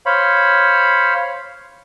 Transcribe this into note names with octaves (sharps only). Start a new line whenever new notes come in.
C5 C#5 F5 B5